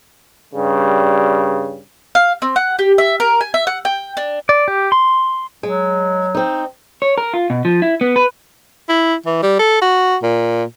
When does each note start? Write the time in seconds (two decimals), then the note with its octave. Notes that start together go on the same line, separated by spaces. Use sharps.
0.54 G2 C#3 G3
2.15 F5
2.42 C4
2.56 F#5
2.79 G4
2.98 E5
3.20 A#4
3.41 G#5
3.54 E5
3.67 F#5
3.85 G5
4.17 D4
4.49 D5
4.68 G4
4.92 C6
5.63 F#3 G#3
6.35 C4 D#4
7.02 C#5
7.18 A#4
7.34 F4
7.50 B2
7.65 F3
7.82 E4
8.01 B3
8.16 B4
8.89 E4
9.26 E3
9.43 G3
9.59 A4
9.82 F#4
10.23 A#2